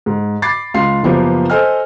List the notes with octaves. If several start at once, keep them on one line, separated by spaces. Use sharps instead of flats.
G#2
B5 D6 A6 C7
C#2 F5 C6 C7
F#1 F3 A#3 B3 G4 B4
A4 C5 D#5 G#5 F6